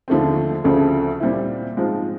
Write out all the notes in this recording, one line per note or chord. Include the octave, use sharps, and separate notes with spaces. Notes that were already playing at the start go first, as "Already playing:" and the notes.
D#2 D3 F3 A3 C4
D2 C#3 F3 A3 C4
A#2 G3 C4 E4
G#2 F3 G#3 C4 F4